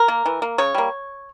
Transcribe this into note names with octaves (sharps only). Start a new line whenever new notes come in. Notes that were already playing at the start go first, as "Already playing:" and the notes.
Already playing: A#4
A#3
E3
A#3
C#3 C#5
G3 A#3